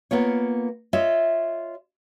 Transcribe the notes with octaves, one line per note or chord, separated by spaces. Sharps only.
A#3 B3 F4 C#5
F4 C#5 D#5 E5